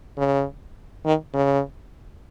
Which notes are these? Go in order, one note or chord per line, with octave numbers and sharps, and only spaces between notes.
C#3
D#3
C#3